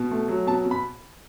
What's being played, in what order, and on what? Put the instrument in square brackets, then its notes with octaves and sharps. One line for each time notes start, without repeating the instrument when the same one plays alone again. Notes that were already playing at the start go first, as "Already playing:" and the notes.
Already playing: [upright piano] B2
A3
F#3
B2 A5
B2
B5